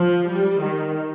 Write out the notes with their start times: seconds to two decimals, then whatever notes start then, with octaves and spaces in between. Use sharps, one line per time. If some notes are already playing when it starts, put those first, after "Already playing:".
Already playing: F3
0.28 G3
0.62 D#3